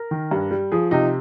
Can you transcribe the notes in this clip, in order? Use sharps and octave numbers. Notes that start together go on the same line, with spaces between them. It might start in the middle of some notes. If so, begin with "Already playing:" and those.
Already playing: A#4
D#3
G2
G3
F3 G#4
C3 D#4